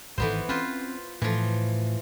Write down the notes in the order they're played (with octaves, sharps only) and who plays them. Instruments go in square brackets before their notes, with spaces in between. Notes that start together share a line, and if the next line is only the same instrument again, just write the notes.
[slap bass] D1 G#1 [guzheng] E3 B3 C5
[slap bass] C4 C#4 [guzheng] F4 B4 C5
[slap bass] A2 [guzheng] E3 F3